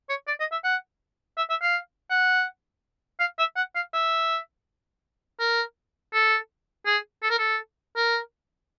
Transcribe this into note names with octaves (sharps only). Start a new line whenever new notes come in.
C#5
D5
D#5
E5
F#5
E5
E5
F5
F#5
F5
E5
F#5
F5
E5
A#4
A4
G#4
A4
A#4
A4
A#4